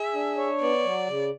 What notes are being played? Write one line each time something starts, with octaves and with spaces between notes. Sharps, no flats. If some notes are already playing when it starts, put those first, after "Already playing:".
Already playing: G#4 E5
D4
C#5
B3 D5
F#3
C#3